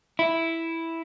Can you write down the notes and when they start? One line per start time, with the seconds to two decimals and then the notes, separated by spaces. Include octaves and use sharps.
0.19 E4